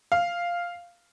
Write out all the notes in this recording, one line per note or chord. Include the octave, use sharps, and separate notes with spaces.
F5